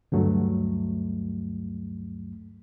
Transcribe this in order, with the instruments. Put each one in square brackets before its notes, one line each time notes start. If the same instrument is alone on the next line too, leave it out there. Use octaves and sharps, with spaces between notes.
[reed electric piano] D2 G2 F#3 A3